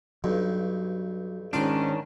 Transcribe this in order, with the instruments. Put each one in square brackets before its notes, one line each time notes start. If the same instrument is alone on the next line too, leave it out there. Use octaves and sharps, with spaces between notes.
[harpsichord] B1 G2 [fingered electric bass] F#3
[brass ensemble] G#2 C#4 [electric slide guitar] D#3 D4 [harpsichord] F4 F5 C6